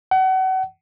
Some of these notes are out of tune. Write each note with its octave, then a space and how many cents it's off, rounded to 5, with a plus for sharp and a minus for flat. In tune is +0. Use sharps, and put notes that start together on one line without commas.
F#5 +35